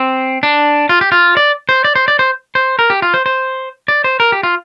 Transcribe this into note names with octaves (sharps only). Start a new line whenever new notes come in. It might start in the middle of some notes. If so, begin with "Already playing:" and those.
Already playing: C4
D4
F4
G4
F4
D5
C5
D5
C5
D5
C5
C5
A#4
G4
F4
C5
C5
D5
C5
A#4
G4
F4